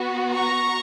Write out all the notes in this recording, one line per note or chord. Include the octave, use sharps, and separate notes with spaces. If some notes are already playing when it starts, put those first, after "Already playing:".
Already playing: B3 F#4
A#5 C#6